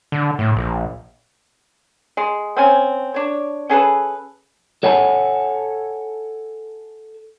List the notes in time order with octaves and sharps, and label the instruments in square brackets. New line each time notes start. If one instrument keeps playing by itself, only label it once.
[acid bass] D3
A2
A#1
[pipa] G#3
C4 C#4 G#5
D4 C#5
C#4 G#4 A4 B4
[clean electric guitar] A4 C#5 F#5 G#5 A5 B5